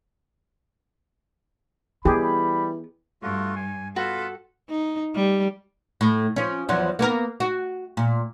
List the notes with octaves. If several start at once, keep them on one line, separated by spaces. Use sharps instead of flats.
E3 G3 B3 G4 G#4 B5
G2 A3 F4 F#4
G#5
B3 F4 F#4 A4 B4
D#4
G3
A2
F3 C#4
E2 F3 F#3
A#3 B3 A#4
F#4
A#2